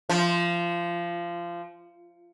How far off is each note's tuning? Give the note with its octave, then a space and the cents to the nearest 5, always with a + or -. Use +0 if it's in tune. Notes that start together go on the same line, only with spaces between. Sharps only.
F3 -20